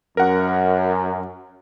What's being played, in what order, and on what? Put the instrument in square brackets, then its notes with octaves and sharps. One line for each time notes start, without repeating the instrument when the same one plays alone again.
[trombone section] F#2 [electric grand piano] A#4 F#5